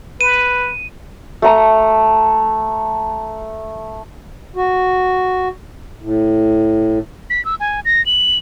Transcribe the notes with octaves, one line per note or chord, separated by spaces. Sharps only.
B4 D#7
A3 A#5
F#4
A2
B6
E6
G#5
A#6
F#7